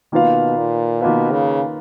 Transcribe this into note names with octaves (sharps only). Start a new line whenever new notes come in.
B2 D#3 A#3 F4 B4 F5
A#2
B2 D#3 A#3 F4 B4 F5
C#3